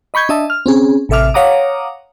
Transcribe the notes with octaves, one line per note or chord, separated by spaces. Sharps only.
D#5 B5 C#6 G6 G#6
D4 D#5 E5 A5
F6
C4 C#4 G#4
A1 C3 A4 E5 D6 F6
C#5 F5 F#5 A#5 D6 D#6